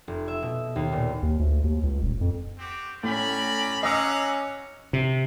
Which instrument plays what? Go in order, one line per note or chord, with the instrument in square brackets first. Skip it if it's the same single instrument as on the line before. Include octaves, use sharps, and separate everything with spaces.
[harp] F1
E5
B2
D#2
A#2
[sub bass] D#2
D2
D#2
C#2
D#1
F2
[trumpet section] C4 F#4 G4
[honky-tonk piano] A2 [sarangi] C#4 [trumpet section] D5 A#5 B5
[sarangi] C#4 [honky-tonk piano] D#5 D6 E6 [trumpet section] F5 F#5 A#5
[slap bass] C3